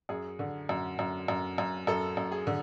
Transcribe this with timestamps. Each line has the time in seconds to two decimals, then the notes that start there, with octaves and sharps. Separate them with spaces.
0.09 F#2 G#4
0.39 D3
0.69 F#2
0.99 F#2
1.28 F#2
1.58 F#2
1.87 F#2 A4
2.17 F#2
2.32 G#4
2.47 D3